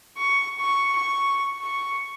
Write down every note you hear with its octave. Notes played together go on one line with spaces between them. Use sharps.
C#6
C#6
C#6
C#6